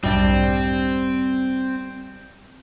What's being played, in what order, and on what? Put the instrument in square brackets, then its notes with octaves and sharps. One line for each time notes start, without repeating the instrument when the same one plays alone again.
[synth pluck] B1 F2 G#2 [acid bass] G3 [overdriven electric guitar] C4 [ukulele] D4 D#4 G4